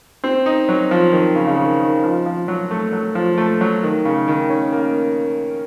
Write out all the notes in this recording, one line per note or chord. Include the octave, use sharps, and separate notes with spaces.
C4
D#4
F#3
F3
D#3
C#3
C#3
D#3
D#3
F3
F3
F#3
A3
F#3
F3
A3
F#3
D#3
C#3
D#3
C#4
A#3